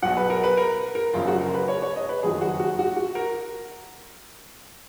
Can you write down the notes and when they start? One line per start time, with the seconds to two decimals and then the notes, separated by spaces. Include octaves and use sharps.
0.03 B1 B2 F#3 F#5
0.17 B4
0.30 A#4
0.44 B4
0.57 A#4
0.95 A#4
1.13 F#1 F#2 C#3 F3 F4
1.27 F#4
1.41 A#4
1.54 B4
1.68 C#5
1.82 C#5
1.96 D#5
2.09 B4
2.23 F#1 F2 D#3 F#3 G#4
2.41 F#4
2.60 F#4
2.79 F#4
2.97 F#4
3.15 A#4